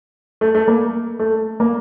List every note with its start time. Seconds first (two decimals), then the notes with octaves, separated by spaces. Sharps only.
0.41 A3
0.55 A3
0.68 A#3
1.19 A3
1.60 A#3